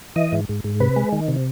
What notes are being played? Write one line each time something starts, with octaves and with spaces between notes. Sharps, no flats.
E3 D#5
G#2
G#2
G#2
C3 B4
G#3
D#3
C3